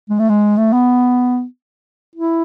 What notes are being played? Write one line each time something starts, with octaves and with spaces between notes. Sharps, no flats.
G#3
A3
G#3
A3
B3
E4